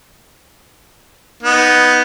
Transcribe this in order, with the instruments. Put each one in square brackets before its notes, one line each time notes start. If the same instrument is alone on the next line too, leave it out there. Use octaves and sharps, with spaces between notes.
[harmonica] B3 D#4